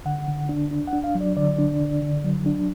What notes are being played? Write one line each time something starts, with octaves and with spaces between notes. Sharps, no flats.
D3 F#5
D3
D4
D4
F#5
D4
F5
F#3
D5
D3 D5
D4
D3
D3
F#3
D4